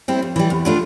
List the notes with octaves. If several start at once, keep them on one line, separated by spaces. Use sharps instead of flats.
G3 C4 E4
F2
E3 G3
E2
B2 A3 D4 F4